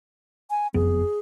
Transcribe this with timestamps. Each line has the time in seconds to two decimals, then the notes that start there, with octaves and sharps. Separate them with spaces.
0.50 G#5
0.74 F#1 F2 B3 G#4